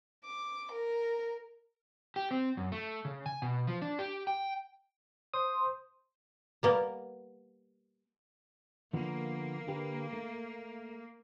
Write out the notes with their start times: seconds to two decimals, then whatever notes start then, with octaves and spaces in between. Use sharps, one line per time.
0.25 D6
0.71 A#4
2.16 G4
2.31 C4
2.57 F#2
2.72 A3
3.05 C#3
3.26 G#5
3.42 B2
3.67 F3
3.82 D4
3.99 G4
4.27 G5
5.34 C5 D#6
6.63 G3 A#3 B3
8.93 D3 F3 A#3 B3
9.68 D3 G4 B4
10.13 A3